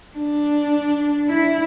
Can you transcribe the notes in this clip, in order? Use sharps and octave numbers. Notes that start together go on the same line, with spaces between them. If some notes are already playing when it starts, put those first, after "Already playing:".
D4
E4